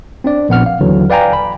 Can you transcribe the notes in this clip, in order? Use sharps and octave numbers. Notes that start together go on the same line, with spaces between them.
C4 D4 D5
A#1 B3 F#5 F6
F5
D#2 D3 E3 F#3
B4 D5 F5 G5 G#5 A#5
B5